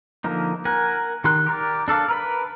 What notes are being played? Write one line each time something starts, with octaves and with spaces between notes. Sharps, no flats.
D3 F3 A#3 D#4
A#4 F#5 G#5
D#3 G4 C6 F#6
G4 A#4 D5
D4 A4 D5 F5
A#4 B4 B5